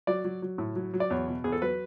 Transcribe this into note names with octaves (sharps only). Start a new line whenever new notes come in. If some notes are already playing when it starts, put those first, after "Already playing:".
F#3 D5
F#3
F#3
A2
F#3
F#3
D5
E2 C#5
B2
E2 G#4
A4
F#3 B4